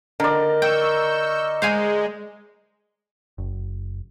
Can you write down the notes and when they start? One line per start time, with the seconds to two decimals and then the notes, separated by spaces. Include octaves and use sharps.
0.20 D3 A#4 D5 D#5
0.62 G5 C#6 E6 G6
1.62 G#3 C5 F5 G#5
3.38 F#1